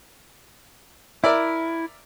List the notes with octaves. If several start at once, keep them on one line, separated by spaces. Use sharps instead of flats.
E4 A#4 D5 E5